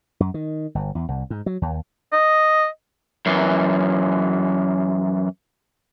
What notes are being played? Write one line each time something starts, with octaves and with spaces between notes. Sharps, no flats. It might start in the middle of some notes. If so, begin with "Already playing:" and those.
F#2
D#3
G1
E2
C2
G#2
F#3
D#2
D#5
F#2 E3